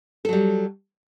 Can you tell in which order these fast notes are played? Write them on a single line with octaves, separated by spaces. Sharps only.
A4 F#3 G3